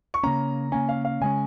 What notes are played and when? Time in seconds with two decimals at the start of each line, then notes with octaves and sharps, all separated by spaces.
0.14 C#6
0.23 C#3 A#3 C#4 A#5
0.72 C#3 A#3 C#4 G#5
0.89 F5
1.05 F5
1.21 C#3 G#3 C#4 G#5